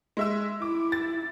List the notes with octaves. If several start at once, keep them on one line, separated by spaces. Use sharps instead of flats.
G#3 E5 E6
E4 D6
A6